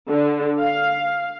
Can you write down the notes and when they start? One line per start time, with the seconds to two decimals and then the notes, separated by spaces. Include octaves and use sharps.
0.10 D3
0.58 F5